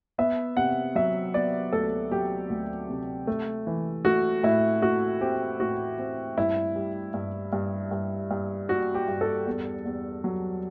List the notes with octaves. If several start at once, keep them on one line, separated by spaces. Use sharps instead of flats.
B3 E5
C3 F#5
F#3 E5
B3 D5
D2 A4
F#3 G4
D2
C3
A3
E3
A3 F#4
A2 E4
A3 F#4
C4 G4
A2 F#4
C4
G2 E4
G3
G2
G2
G2
G2
G3 F#4
G4
G2
A4
E2
E2
F#3